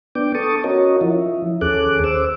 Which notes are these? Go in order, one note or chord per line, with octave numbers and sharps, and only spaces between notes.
B3 D4 G5 D6
A4 A5 C#6 D#6
C#4 F#4 A#4 C#5 D#5
F3 E4
D#2 C#4 G#4 A4 D6 F#6
C5 D6 E6